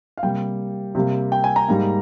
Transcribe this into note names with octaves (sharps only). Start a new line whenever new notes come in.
F5
C3 G3 A#3 G5
C3 G3 A#3
G5
G#5
A#5
G#2 G3 A#3